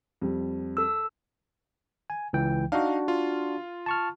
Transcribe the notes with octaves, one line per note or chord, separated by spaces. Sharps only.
F2 G3
A4 E6
G#5
C#2 E3 G5
D4 D#4 F#4 F5
F4
A5 C#6 F6